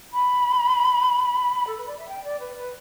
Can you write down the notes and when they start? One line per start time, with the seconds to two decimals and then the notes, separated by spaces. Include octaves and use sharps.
0.13 B5
1.67 A4
1.77 B4
1.87 D5
1.98 E5
2.08 G5
2.24 D5
2.39 B4
2.56 B4